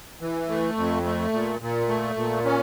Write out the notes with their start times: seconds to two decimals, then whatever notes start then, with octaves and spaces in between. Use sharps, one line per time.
0.21 E3
0.49 A3
0.77 F2
1.05 A3
1.33 A#2
1.61 A#2
1.89 A3
2.17 A#2
2.45 C#4